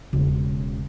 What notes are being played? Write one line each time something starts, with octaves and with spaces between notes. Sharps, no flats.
E1 C#3